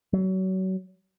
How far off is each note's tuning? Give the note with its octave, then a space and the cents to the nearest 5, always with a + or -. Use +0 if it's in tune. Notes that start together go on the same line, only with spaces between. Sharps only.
F#3 +30